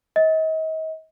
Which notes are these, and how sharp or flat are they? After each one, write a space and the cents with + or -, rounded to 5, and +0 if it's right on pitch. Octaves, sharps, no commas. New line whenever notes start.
D#5 +40